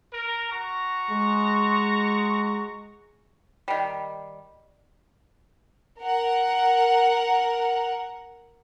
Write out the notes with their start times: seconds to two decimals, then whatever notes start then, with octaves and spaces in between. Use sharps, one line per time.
0.13 A#4
0.50 F#4 A#5 C#6
1.10 G#3
3.68 D#3 G3
6.00 A#4 F#5